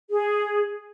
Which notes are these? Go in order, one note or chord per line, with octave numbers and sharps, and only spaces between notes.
G#4